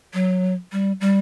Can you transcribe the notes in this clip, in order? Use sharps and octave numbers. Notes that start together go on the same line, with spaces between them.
F#3
G3
G3